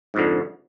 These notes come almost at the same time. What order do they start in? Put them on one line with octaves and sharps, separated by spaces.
G#2 F2 D3